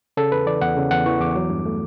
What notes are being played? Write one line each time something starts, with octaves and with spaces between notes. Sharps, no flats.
C#3 A4
E2 B4
E3 D5
E2 F#5
C#3
E2 F#5
E3 C#6
E2 D6
F#3
G2
A3